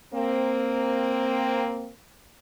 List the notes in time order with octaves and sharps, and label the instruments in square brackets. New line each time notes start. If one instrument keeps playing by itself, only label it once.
[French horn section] A#3 C4